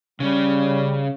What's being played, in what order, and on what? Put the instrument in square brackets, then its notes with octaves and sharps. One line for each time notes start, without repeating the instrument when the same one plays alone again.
[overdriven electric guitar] C#3 C#4 [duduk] G3